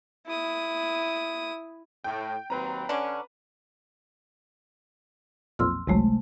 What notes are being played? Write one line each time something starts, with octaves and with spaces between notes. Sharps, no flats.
E4 D#6
A2 G5
D#2 F#3 C4 B4 A#5
D3 C#4 D4
B1 F2 A#2 C6 E6 F6
G#1 C#2 C3 F#3 G#3 A3